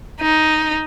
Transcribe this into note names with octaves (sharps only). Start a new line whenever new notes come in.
D#4